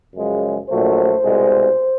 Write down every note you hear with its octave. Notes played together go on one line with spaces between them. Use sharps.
F#2 C#3 F3 G#3
A#1 A#2 F#3 A3 C5
C2 B2 G#3